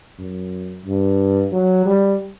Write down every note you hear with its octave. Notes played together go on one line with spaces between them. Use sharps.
F#2
G2
F#3
G3